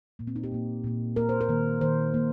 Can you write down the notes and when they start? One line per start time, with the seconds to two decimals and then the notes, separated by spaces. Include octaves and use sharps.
0.19 A#2 A#3
0.27 C4
0.36 D#4
0.44 G4
0.52 A#2 A#3
0.84 A#2 A#3
1.16 A#2 A#3 A#4
1.29 C5
1.41 A#4
1.49 D#3 A#3
1.81 D#3 A#3 C5
2.14 D#3 A#3